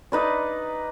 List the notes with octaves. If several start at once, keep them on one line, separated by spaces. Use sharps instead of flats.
D#4 B4 D5